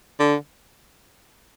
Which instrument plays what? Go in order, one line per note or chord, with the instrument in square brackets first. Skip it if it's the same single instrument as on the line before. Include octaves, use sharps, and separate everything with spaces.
[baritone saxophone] D3